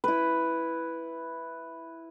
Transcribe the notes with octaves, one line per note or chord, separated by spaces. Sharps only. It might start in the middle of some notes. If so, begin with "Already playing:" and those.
E4 B4